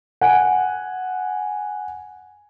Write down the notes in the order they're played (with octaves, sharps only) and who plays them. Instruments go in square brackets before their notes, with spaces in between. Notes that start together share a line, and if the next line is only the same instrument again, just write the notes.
[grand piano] F#5 G#5